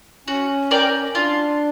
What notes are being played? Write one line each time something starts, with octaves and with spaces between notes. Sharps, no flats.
C#4 F#4
A#4 D5 G5
D4 F4